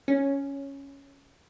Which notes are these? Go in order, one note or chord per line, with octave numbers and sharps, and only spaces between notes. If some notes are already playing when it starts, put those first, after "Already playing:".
C#4